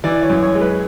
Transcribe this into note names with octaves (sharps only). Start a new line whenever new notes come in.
E3 D5
C#5
F#2
C#5
G#3
B4